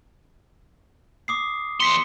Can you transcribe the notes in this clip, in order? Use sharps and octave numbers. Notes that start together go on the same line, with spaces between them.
D6 D#6 C7
E2 C6 B6 C#7